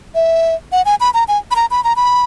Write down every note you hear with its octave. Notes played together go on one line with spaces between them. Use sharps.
E5
F#5
G#5
B5
A#5
G#5
B5
A#5
B5
A#5
B5